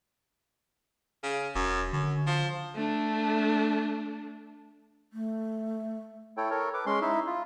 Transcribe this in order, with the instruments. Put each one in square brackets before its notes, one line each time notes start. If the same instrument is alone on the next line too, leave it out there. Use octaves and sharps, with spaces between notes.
[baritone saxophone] C#3
[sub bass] E1 [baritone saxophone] F#2
[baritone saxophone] F#2 [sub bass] D3
[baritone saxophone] F3
[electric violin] A3 D4
[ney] A3
[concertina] E4 A4 C#5 G5
A4 A#4 C#5
B4 D6
G#3 C#4 C6
D#4 E4 E5
F4